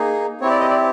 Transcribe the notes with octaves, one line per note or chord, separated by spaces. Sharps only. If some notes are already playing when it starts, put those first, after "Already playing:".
Already playing: A#3 D#4 G#4
C4 E4 G4 C#5
D5
D#5
D5